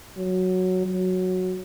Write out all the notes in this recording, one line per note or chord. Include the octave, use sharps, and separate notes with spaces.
F#3
F#3